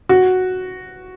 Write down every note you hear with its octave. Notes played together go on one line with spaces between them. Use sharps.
F#4